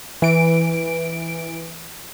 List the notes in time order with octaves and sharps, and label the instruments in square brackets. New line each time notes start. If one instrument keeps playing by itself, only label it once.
[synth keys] E3 D7